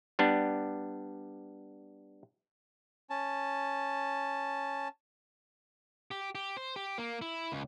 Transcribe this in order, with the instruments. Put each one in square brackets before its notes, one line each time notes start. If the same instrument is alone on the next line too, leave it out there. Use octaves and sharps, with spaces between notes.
[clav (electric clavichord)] G3 B3 D4
[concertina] C#4 A5
[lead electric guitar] G4
G4
C5
G4
A#3
E4
C#2